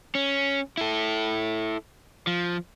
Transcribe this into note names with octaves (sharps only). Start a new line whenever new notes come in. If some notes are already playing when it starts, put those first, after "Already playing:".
C#4
E4 A4
F3